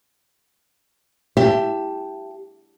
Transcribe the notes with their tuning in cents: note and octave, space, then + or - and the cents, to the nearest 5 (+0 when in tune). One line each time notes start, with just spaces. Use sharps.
G4 +0 E5 +20 A5 +0